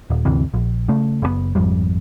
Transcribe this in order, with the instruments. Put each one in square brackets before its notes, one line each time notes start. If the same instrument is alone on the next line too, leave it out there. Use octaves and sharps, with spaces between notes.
[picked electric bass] D#1
G1 D2 C3 E3
A#1
C#3 A3
F#1 B2 B3
G#1 F2 G3